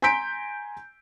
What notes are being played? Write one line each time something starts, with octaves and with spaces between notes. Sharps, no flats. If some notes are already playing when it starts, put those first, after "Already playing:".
G#5 A#5 C6 G6 B6 D7